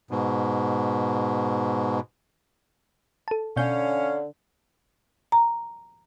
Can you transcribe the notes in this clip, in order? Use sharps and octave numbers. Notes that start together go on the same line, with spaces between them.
G#2 B2
A4 A5
B2 D3 C#4 F5 G6
A#5